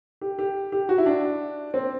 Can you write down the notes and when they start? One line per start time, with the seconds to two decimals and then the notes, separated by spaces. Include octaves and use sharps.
0.21 G4
0.39 G4
0.72 G4
0.89 F#4
0.98 E4
1.06 D4
1.74 C4